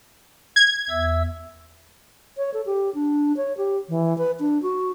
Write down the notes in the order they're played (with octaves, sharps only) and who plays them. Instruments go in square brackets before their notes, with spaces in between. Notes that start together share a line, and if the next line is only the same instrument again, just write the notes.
[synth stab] G#6
[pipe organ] E2 E5 E6
[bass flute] C#5
A4
G4
D4
C#5
G4
E3
B4
D4
F#4